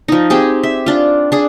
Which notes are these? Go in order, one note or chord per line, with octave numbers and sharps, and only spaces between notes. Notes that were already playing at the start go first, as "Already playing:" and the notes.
F3 D#4
C4 G4 G#4
E5
D4 F4
D4 G#4